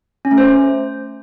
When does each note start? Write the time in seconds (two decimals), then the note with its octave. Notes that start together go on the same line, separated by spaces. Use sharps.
0.25 C#4
0.31 A3
0.38 C5